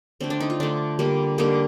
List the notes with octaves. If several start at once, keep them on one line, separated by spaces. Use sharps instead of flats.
D3 A3 C4
D4
D#4
F4
D3 A3 D4
D3 G3 A#3
D3 G3 A#3 D#4